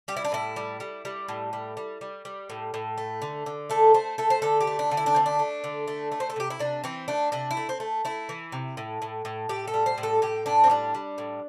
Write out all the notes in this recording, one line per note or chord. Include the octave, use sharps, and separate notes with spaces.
G3 G4
E4
D4
A2 E4
G3
G3
G3
A2
G3
G3
G3
G3
A2
A2
A3
D3
D3
A3 A4
A3 C5
A3 A4
C5
D3 A4
G4
A3
D4
D3
E4
D4
A3 C4
D4
A3
D3
A3
A3
C5
A4
C3 G4
E4
C3 D4
E3 C4
A3 D4
C3 D4
E4
A3
C4
A3
A3 E4
E3
C3
A2
A2
A2
A2 G4
A4
G3
C5
A2
A4
A2 G4
A2 D4
C4
G3 D4
G3
A2